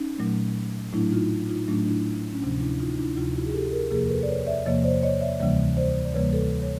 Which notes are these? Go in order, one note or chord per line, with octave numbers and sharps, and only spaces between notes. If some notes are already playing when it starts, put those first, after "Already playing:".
Already playing: C#4 D#4
A#2 F#3 A3
A2 F#3 A3 D4 E4
D#4 F4
D#4 F4
A2 F#3 A3 D4
D4 E4
C#4
D2 C3 F3 D4
D4 E4
D#4 F4
D4 E4
D2 C3 F3 D#4 F4
E4 F#4
G#4
G4 A4
G#4 A#4
E2 C3 F3 A#3 G#4 A#4
A#4
A4 B4
D5
B4 C#5
D5 E5
E2 C3 F3 A#3 C#5 D#5
C5 D5
C#5 D#5
D5 E5
D2 C3 E3 G3 A#3 D5 E5
C5 D5
D5
D2 C3 E3 G3 A#3 B4 C#5
A4 B4
C#5